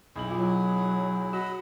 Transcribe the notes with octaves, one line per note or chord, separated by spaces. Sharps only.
B1 E4 G#4 F#7
F#3 F4
F#4 D#5 F#5 B5